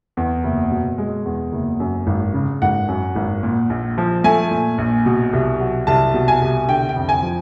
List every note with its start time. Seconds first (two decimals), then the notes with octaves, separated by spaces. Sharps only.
0.17 E2
0.44 F#1
0.71 B2
0.98 G#3
1.26 E2
1.52 F#1
1.80 F#2
2.07 G#1
2.34 C#3
2.62 G#1 F#5
2.88 F#2
3.16 G#1
3.43 A#2
3.70 A#1
3.98 F3
4.24 A3 G#5
4.51 A#2
4.78 A#1
5.06 B2
5.33 C2
5.60 F#3
5.87 C2 A5
6.14 B2
6.28 G#5
6.42 C2
6.68 D3 G5
6.89 G5
6.95 F2
7.09 G#5
7.23 F3